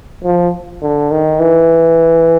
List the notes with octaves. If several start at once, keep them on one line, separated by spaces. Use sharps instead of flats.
F3
D3
D#3
E3